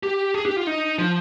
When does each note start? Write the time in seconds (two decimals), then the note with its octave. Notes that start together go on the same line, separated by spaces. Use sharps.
0.03 G4
0.34 G#4
0.46 G4
0.57 F4
0.67 D#4
0.98 F3